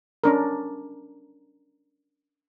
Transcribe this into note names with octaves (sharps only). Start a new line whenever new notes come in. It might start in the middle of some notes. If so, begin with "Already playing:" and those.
C#4 D4 A#4